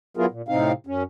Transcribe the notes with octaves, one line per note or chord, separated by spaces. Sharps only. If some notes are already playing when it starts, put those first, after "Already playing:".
F#3 B3 E4 F4 G#4 A#4
A#2
A2 C3 C4 D#4 F5
F#2 C#4